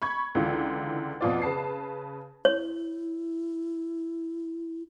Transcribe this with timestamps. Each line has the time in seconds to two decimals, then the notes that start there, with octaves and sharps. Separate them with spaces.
0.02 B5 C#6 G#6
0.35 C#2 D3 E3 F4
1.21 F2 B2 F4 D5
1.42 C#3 B4 A5 C7
2.45 E4 C#5